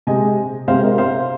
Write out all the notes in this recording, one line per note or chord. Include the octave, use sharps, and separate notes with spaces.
C3 G#3 C4 D#5 G#5
C3 G#3 C4 C5 F5
A#4 D#5
C5 F5